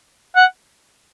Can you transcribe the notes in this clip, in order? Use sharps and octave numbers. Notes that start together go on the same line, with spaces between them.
F#5